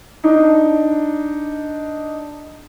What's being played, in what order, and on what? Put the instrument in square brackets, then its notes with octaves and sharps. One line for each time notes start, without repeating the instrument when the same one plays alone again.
[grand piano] D4 D#4